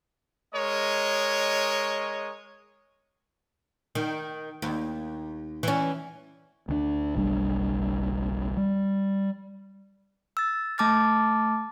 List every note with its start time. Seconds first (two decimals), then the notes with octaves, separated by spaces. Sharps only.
0.55 G#3 A#4 C#5 D#5
3.95 D#3
4.62 D#2
5.63 E3 C#4
6.69 D2 G#3 D4
7.15 F#1 B1 G3 D4
8.57 G3
10.37 E6 A6
10.78 A3 A5 D6 F6 A6